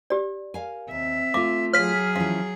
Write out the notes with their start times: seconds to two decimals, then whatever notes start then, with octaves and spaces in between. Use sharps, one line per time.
0.10 G4 D5
0.54 A#4 F5 G#5
0.91 D#2 C4 E5
1.34 A3 F4 F5 D6
1.73 F#3 G#4 C#5 F5 F6 B6
2.16 E3 F3 C#4 F5